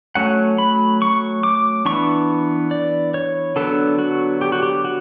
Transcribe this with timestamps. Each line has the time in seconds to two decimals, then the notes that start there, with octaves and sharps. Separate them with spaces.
0.15 F#3 A3 C#4 F#5
0.58 B5
1.02 C#6
1.43 D6
1.85 E3 B3 D4 C#6
2.71 D5
3.14 C#5
3.56 D3 F#3 B3 D4 A4
3.99 F#4
4.41 G4
4.52 F#4
4.63 G4
4.84 F#4